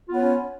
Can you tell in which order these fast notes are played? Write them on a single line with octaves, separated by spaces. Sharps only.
F4 B3 C#5 C#4